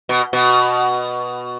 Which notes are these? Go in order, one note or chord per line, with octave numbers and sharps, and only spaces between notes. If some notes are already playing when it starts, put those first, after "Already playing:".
B2
B2